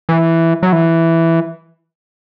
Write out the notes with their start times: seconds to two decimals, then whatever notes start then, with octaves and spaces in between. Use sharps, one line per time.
0.09 E3
0.63 F#3
0.73 E3